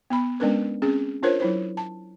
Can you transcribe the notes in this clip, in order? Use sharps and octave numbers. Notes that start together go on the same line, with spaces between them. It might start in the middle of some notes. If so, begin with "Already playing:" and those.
B3 B5
G#3 B3 C#4 D4 A#4 B4
C4 C#4 G#4
D4 F4 A#4 C5 C#5
F#3 E4 C5
A5